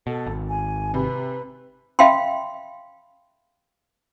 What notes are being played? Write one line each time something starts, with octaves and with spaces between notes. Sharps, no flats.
B2 A4
G#1
G#5
C3 B4 B5
E5 F5 G5 B5 C6